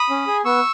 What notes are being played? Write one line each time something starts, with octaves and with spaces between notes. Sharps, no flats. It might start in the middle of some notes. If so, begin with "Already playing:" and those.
Already playing: B5 D#6
C#4
G#4
B3 C#6 E6